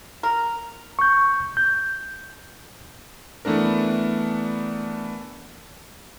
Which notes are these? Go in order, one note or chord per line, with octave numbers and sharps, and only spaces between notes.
A#4
C#6 G6
G6
E3 A3 B3 D4 A#4